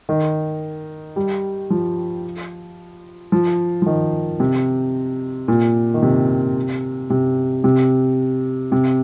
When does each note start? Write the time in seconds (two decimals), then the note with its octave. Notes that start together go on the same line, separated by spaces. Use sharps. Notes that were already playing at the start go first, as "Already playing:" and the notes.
0.09 D#3
1.16 G3
1.70 F3
3.32 F3
3.82 F3
3.86 D#3
4.40 C3
5.48 A#2
5.94 D#3
6.02 C3
7.10 C3
7.64 C3
8.72 C3